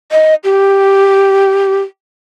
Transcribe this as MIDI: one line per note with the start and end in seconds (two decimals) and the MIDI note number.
0.12 0.35 75
0.44 1.80 67